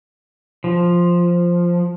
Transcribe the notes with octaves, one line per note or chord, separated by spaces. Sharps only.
F3